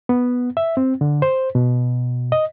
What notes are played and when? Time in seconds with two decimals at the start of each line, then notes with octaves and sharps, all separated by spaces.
0.09 B3
0.57 E5
0.77 C4
1.01 D3
1.22 C5
1.55 B2
2.32 D#5